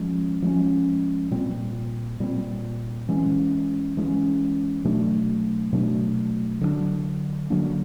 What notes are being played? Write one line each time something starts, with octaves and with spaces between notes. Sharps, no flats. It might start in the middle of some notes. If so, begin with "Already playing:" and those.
Already playing: F3 G#3 C#4
F3 G#3 C#4
A#2 G3 C4
A#2 G3 C4
E3 G#3 C#4
E3 G#3 C#4
B2 F#3 A3 D4
B2 F#3 A3 D4
D3 F#3 A#3 D4
D3 F#3 A#3 D4